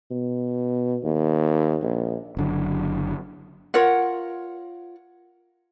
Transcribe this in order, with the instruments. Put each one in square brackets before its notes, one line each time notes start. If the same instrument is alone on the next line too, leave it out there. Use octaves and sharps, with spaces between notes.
[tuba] B2
D#2
A#1
[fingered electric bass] F#1 D3 F#3
[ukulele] F4 A#4 C#5 F#5